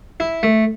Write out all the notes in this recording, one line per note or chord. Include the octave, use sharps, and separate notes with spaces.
E4
A3